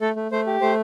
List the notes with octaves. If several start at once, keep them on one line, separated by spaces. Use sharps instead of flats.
A3 A4
A3
A3 C5
G4
A3 C5